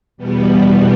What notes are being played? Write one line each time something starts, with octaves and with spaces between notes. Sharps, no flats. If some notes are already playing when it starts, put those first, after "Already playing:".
E2 B2 G3 B3